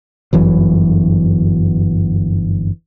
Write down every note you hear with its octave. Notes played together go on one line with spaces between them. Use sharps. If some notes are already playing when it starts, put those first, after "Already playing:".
G1 F#2 E3 F#3